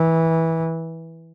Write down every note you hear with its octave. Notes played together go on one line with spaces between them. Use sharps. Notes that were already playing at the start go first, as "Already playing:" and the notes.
Already playing: E3